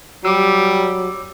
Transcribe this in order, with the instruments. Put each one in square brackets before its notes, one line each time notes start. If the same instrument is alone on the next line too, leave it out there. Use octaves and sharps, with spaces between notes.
[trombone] F#3 [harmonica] G3 [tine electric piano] D6 E6